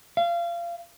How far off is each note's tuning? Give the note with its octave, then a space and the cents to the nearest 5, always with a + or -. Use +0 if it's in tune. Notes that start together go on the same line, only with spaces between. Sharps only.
F5 -25